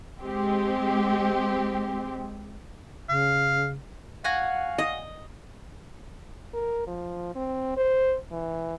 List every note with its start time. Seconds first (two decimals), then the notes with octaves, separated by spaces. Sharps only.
0.21 G#3 C4 G4
3.09 C#3 F5
4.24 F#4 F5 F#5 G#5
4.78 D#5
6.54 A#4
6.87 F3
7.35 C4
7.77 C5
8.31 E3